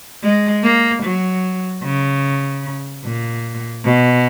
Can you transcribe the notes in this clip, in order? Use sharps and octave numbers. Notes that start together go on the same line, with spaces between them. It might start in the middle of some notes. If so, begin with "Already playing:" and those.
G#3
A#3
F#3
C#3
A#2
B2